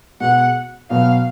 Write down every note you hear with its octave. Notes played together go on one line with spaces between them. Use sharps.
B2 G#3 B3 F#4 F#5
B2 F#3 B3 F#4 F5